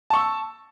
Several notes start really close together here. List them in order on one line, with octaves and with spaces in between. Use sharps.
A5 C#6 E6